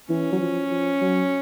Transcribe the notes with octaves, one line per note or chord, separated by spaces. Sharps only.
E3 C#4
F#3
F3
F3
F#3